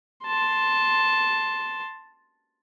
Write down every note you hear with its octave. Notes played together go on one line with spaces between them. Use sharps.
A5 C6